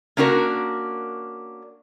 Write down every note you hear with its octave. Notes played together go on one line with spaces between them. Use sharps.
A#3 C#4 D4 F#4 A#4